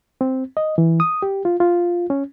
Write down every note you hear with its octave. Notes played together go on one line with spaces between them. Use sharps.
C4
D#5
E3
D#6
G4
F4
F4
C#4